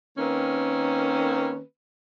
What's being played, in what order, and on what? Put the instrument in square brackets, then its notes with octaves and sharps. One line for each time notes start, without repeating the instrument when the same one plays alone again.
[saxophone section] D#3 A#3 C4 C#4 B4